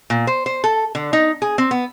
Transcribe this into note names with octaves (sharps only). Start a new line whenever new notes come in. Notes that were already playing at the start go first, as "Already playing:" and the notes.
A#2
C5
C5
A4
D3
D#4
G#4
C4
B3